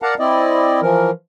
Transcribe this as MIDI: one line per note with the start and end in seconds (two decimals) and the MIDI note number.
0.02 0.14 70
0.02 0.14 74
0.02 0.14 77
0.02 0.14 78
0.02 0.14 81
0.02 0.14 82
0.19 0.80 60
0.19 0.80 64
0.19 0.80 74
0.19 0.80 75
0.82 1.11 52
0.82 1.11 53
0.82 1.11 70